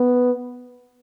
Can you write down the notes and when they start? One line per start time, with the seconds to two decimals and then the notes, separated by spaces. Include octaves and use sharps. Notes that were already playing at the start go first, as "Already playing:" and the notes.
Already playing: B3